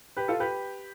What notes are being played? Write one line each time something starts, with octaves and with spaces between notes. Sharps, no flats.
G4 B4
F4 A4
G4 B4